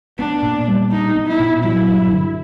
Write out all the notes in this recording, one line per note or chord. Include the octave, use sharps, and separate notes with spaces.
B3 D4
A#2
G3
D4 D#4
B3
E4
A#2
F#3 E4
G2
D3